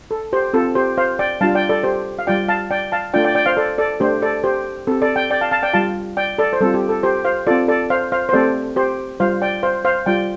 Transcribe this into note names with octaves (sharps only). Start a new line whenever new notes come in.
A4
G4 C5
C4 F4 A4
G4 C5
C5 F5
D5 G5
G3 D4 F4 F5 A5
D5 G5
A4 D5
G4 C5
F5
G3 F4 D5 G5
F5 A5
D5 G5
F5 A5
A3 D4 F4 D5 G5
D5 G5
D5 G5
C5 F5
A4 D5
A4 D5
A3 D4 G4 C5
A4 D5
G4 C5
C4 G4 A4
A4 D5
D5 G5
D5 G5
F5 A5
F5 A5
D5 G5
G3 F4 F5 A5
D5 G5
A4 D5
C5
G3 C4 F4 A4
G4
A4
G4 C5
C5 F5
C4 F4 A4 D5
A4 D5
C5 F5
C5 F5
C5
A3 C4 G4 A4 D5
G4 C5
G3 F4 C5 F5
D5 G5
C5 F5
C5 F5
G3 F4 D5 G5